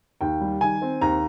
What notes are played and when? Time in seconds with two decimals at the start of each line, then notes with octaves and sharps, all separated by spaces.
0.21 D#2 G5
0.41 G3
0.61 D#3 G#5
0.82 C4
1.01 D#2 A#5